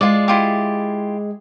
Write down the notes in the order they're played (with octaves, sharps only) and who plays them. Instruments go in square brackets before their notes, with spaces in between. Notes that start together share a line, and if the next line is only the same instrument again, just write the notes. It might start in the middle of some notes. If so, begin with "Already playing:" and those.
[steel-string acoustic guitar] G#3 [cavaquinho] F4 D5
[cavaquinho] E4 F4 G4